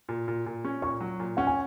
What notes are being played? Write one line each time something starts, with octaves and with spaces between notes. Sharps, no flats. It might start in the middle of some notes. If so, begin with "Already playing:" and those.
A#2
A#2
A#2
C#4
A#2 C#6
F#3
A#2
C#4 F#5
G#5